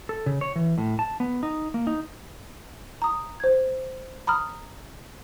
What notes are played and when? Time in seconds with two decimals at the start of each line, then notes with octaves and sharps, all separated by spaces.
0.09 A4
0.26 C#3
0.41 C#5
0.56 E3
0.78 A2
0.99 A5
1.20 B3
1.43 D#4
1.74 A#3
1.87 D#4
3.02 A#5 D#6
3.40 C5 G#6
4.27 A#5 B5 D#6 F6